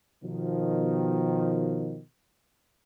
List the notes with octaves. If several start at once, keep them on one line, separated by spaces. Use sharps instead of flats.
B2 D#3 F3